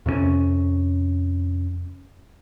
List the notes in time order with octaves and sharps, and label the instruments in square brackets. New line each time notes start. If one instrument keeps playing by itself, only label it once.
[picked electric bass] F2 C3 A#3 C#4